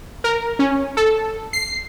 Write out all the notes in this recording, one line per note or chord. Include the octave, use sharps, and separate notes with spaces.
A#4
C#4
A4
C7